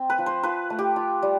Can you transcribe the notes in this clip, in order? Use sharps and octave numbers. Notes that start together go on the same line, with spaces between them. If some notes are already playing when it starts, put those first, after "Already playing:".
Already playing: C4
B4
F3
C5
F3 B4
A3
G4
F4
G3